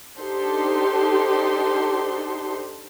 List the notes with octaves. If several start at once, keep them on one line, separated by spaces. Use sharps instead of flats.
D4 D#4 G4 A4 C5 C6